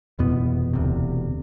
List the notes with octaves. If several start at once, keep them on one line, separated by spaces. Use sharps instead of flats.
F1 E2 B2 B3
E1 D2 C3